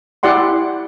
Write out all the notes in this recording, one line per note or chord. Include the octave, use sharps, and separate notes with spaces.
E4 G4 D5 F#5 C6